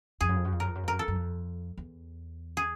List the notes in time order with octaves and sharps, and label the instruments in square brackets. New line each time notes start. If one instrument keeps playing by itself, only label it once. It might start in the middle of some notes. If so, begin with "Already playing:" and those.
[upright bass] F2 [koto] G#4
[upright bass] F#2
F2
F#2
F2
[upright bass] F#2 [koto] A#4
[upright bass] F2
F#2
F2
[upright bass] F#2 [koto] A#4
[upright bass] F2 [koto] A4
[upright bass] F#2
F2
E2
[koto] G#4